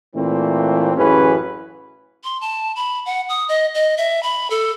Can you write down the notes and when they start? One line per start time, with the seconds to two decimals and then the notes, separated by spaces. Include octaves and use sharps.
0.15 A#2 E3 A3 C4
0.97 A1 F#2 E3 C#4 G#4 B4
2.24 C6
2.41 A5
2.76 B5
3.06 F#5
3.29 D#6
3.49 D#5
3.75 D#5
3.97 E5
4.23 B5
4.50 A4